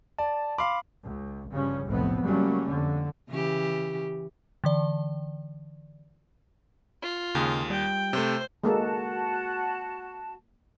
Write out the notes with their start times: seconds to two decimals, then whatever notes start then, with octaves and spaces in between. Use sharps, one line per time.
0.19 D5 A5
0.58 F5 B5 C6 D6
1.04 C#2
1.52 G1 C#3 F3 G3 C#4
1.88 F1 B1 F2 A2 B3 C4
2.23 C#3 F#3 G3 A3 A#3 C#4
2.71 F2 D3
3.29 C#3 E3 G4
4.64 D3 E3 D5
7.02 F4
7.35 D#2 C#3 G#3
7.70 G3 G5
8.13 C3 A3 C5
8.64 G#3 A#3 F#4 A4 A5